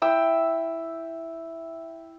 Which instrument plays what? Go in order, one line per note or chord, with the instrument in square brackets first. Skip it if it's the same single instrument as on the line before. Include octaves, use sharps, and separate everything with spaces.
[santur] E4 G5 E6